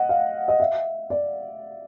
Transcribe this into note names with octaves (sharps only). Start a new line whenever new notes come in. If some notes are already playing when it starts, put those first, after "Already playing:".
Already playing: D#5 F#5
F5
D#5
E5
D5